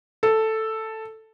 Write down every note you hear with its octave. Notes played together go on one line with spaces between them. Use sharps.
A4